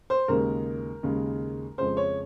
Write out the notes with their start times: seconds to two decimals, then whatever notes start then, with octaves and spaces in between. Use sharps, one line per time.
0.10 C5
0.28 D#2 C#3 G#3 A#4
1.03 D#2 C#3 G#3
1.78 F2 C#3 G#3 C5
1.97 C#5